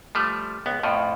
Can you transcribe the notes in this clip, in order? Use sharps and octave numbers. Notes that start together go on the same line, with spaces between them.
F3 G3 A3
C#2 B3
F2 A2 F3